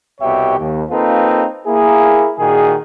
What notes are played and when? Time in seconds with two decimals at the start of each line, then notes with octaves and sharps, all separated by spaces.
0.21 C2 B2 G4 C#5 E5 G5
0.59 D#2
0.90 A#3 C4 D#4 F4 A4 B4
1.67 A#3 E4 G#4
2.38 A#2 D#3 F#4 G#4